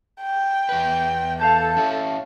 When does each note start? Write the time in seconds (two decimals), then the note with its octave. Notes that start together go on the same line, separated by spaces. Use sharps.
0.22 G5
0.69 E2 B4
1.39 A4 F5 A5 G6
1.77 C#4 E4